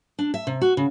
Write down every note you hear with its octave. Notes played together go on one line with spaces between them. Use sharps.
D4
E5
C3
F#4
C#3